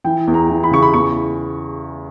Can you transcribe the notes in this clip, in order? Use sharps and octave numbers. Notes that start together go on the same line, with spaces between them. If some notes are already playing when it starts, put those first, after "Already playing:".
E3 G5
E2
A#5
E3
B5
C#3 C#6
B5
E2 C#6